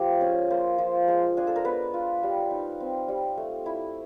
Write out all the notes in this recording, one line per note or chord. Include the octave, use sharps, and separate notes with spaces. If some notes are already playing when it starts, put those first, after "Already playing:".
Already playing: F3 G4
C#4 G#4
A#3 C5
F3
G#3
D4 G#4
A4
A#4
B3 B4
F4
G3
D#4
C4
G3
A3
E4